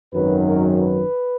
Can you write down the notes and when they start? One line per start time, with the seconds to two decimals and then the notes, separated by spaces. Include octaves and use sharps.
0.13 G#1 F#2 D#3 F#3 B4
0.45 A#4
0.78 B4